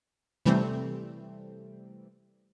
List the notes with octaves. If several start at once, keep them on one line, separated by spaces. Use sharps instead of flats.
C3 E3 G3 A3 C4